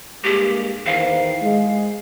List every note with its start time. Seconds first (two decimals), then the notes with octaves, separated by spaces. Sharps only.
0.24 G2 G#3 A#3 G4
0.86 E2 D#3 C5 F5
1.43 G#3